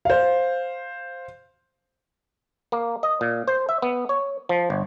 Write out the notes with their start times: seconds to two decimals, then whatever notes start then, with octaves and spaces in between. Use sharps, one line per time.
0.05 C5 F5
2.72 A#3
3.03 D#5
3.21 A#2
3.47 C5
3.69 E5
3.82 B3
4.09 C#5
4.49 F3
4.70 G1